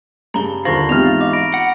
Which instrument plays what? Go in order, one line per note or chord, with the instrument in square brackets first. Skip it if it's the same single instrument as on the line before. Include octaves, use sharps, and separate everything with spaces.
[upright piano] G2 C#3 G7 [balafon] A#5 [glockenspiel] B5
[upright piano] D#2 D3 F#7 [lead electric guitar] F4 [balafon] C5 [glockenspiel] A#5 C#6 A#6
[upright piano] G#2 E3 D#4 [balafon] B3 C4 G4 [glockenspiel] F6 F7
[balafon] D#5 [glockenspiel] D6
[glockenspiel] B5 A#6 D7
[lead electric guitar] F#5